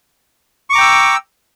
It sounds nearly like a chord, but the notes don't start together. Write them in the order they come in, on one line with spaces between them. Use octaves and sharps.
C#6 D6 A#5 G5 E6